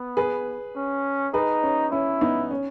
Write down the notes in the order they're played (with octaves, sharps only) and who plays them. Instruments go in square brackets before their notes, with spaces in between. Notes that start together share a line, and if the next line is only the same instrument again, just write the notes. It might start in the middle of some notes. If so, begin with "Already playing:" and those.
Already playing: [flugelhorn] B3
[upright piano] G#4 B4
[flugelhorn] C#4
[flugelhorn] D#4 [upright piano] G#4 B4
[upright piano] C#4
[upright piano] C#4 [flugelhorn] E4
[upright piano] B3 D#4
C#4